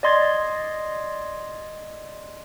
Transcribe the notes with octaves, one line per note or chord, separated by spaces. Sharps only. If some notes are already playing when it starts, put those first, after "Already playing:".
D5 D#5 C6 G#6 A6